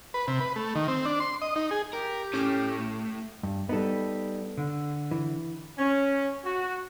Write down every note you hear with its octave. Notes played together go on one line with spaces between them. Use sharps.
B4
C3
B4
A3
D#3
C4
D4
C6
D#5
D#4
G#4
G4 A#4
A2 A3 C#4 D6 F6
G2
G3 B3 D#4 A4
D3
E3
C#4
F#4